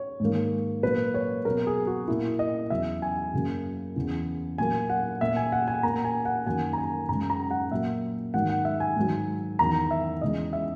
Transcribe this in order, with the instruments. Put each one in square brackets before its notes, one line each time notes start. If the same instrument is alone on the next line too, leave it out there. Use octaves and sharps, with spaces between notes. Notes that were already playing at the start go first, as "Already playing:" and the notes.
Already playing: [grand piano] C#5
G#2 D#3 A#3
A#2 F#3 A#3 B4
C#5
B2 F#3 A#3 A#4
G#4
F#4
A#2 A#3 E4
D#5
E2 C#3 F#3 E5
G#5
F#2 C#3 F#3 A#3
E2 C#3 E3
A#2 F#3 A#3 G#5
F#5
A#2 A#3 E5
G#5
F#5
G#5
A#2 A#3 A#5
G#5
F#5
F#2 D#3 F#3 A#3 G#5
A#5
G#5
F#2 C#3 G#3 A#5
A#5
F#5
A#2 F#3 A#3 E5
G#2 D#3 F#3 A#3 F#5
F#5
E5
G#5
G#2 D#3 F#3
E2 D#3 F#3 A#5
E5
E2 C#3 G#3 D#5
E5